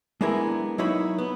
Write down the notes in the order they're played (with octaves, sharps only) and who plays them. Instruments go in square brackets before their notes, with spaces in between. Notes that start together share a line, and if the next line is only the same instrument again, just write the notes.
[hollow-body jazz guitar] G#3 B3 D4 E4 A#4 G#5
F#3 A#3 D#4 E4 C#5 B5
B3